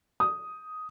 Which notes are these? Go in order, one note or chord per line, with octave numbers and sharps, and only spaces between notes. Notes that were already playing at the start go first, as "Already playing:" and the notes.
D#6